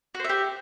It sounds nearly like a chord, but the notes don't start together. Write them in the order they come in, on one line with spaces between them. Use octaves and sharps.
F#4 C5 E5 G4